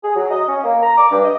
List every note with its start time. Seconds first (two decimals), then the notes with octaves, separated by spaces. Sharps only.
0.04 G#4
0.16 F#3
0.31 D#5
0.48 C#4
0.63 A#3
0.83 A#5
0.98 D6
1.12 G2
1.25 D#5